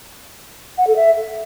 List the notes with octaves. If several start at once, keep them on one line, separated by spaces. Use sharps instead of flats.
F#5
A4
E5